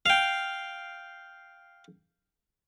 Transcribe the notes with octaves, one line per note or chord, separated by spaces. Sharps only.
F5 G5